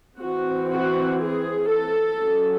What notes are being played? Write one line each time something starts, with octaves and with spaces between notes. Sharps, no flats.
E3 C4 F#4
F#4
G#4
A4
F#3 C#4